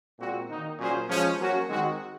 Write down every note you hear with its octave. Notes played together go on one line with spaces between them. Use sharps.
A#2 G#3 C4 F#4
D#3 A#3 D#4
A#2 F#3 C#4 G#4 C5
F3 G#3 C#4
F#3 A#3 C#4 F#4
D#3 G#3 C4 F#4